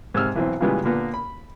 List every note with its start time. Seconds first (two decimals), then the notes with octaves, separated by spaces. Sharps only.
0.14 G#2 C3 E6 F6
0.36 B1 E3 C4
0.60 A#2 C#3 E3 G3 G#3 B3
0.84 A#2 D3 A#3 B3
1.14 B5